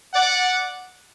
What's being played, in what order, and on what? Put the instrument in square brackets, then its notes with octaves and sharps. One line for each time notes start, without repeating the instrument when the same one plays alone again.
[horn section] D5 F#5